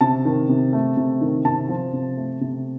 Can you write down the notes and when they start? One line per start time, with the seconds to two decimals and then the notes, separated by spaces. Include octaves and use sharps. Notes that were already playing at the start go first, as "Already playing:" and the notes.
0.01 C3 A5
0.25 D#3
0.49 C3
0.73 A3
0.97 C3
1.21 D#3
1.45 C3 A5
1.69 F3
1.93 C3
2.17 A3
2.41 C3